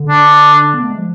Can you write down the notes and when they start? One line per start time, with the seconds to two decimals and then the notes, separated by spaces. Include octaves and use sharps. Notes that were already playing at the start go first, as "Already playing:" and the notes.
Already playing: D3
0.09 D4
0.74 B3
0.82 A3
0.90 G#3
0.98 F3